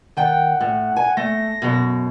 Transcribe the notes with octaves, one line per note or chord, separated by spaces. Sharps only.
D#3 F#5 G5
A2
G#5
A3 A#6
F#2 B2